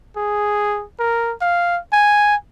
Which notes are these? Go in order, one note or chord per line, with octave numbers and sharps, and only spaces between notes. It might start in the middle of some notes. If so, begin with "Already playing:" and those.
G#4
A#4
F5
G#5